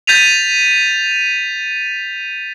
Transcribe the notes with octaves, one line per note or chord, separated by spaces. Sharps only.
G6 A6 B6 D#7 F7